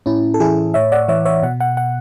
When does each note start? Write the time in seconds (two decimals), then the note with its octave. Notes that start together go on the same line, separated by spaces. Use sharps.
0.06 A2 C#4 E4
0.34 A4
0.40 E3 E4 G#4
0.74 A2 C#5 E5
0.92 D5 F#5
1.08 E3 C#5 E5
1.25 C#5 E5
1.43 B2 F#5
1.60 F#5
1.77 F#5